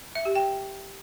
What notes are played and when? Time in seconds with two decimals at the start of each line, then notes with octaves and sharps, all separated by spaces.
0.15 E5
0.25 G4
0.35 G5